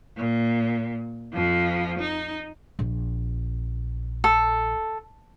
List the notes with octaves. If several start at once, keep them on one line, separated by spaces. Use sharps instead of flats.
A#2
F2 F3
D#4
A#1
A4